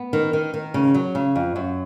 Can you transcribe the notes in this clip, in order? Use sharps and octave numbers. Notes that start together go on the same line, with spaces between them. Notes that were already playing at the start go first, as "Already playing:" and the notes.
Already playing: B3
D#3
D#3
D#3
C#3
F#3
C#3
F2
F#2